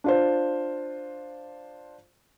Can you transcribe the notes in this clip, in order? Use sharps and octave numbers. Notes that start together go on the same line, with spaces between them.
D4 F4 C5